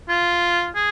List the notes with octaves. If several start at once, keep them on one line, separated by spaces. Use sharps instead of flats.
F4
G#4